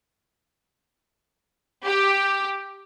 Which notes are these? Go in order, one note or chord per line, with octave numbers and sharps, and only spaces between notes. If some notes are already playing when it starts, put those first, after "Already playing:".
G4